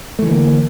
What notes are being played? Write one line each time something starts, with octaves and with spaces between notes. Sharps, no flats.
D3 E3 A3 A#3